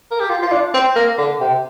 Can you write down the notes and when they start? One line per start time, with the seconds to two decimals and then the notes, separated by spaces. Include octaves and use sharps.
0.11 A#4
0.20 G4
0.29 F4
0.42 F4
0.52 D4
0.74 C4
0.95 A#3
1.18 D3
1.40 C3